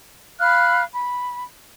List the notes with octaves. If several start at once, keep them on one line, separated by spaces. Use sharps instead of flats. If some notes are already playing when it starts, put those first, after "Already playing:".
F5 B5 F6 F#6
B5